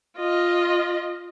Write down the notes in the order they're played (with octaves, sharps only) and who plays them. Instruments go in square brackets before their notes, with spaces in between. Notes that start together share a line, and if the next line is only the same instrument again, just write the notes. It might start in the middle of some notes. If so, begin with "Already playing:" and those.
[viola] F4 D#5